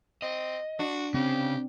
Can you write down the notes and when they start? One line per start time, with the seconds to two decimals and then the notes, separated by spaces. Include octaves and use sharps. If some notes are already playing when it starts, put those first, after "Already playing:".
0.22 C4 D#5
0.79 D4 F#4
1.14 C#3 C4 C#4 G4